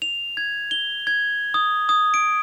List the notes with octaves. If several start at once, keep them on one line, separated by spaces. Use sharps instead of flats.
F7
G#6
G7
G#6
D#6
D#6
D7